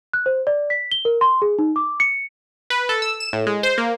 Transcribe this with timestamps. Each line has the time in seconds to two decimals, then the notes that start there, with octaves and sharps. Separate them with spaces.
0.13 F#6
0.26 C5
0.47 D5
0.70 B6
0.92 G7
1.05 A#4
1.21 C6
1.42 G#4
1.59 D#4
1.76 D6
2.00 C#7
2.70 B4
2.89 A4
3.02 E6
3.20 E7
3.33 A2
3.47 G#3
3.63 C5
3.78 A#3